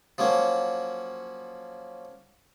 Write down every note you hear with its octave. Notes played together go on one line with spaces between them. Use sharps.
F3 F#3 A#3 C#4